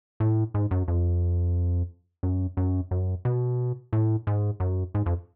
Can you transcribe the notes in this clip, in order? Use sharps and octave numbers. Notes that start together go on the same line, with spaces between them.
A2
G#2
F#2
F2
F#2
F#2
F#2
B2
A2
G#2
F#2
G#2
F2